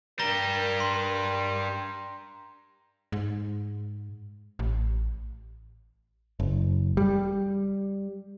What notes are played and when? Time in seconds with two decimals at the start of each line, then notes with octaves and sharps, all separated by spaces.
0.20 G2 G3 A#4 A#5 A#6 G7
0.80 C6
3.12 G#2
4.59 A1
6.40 F#1
6.97 G3